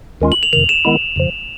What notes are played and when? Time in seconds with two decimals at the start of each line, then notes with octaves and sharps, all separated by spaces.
0.21 D#2 D#3 G#3 C#4 F4
0.32 F#7
0.43 F7
0.53 F2 C3 D#3 F7
0.69 E7
0.85 D#3 G#3 B3 E4
1.16 F2 C#3 F3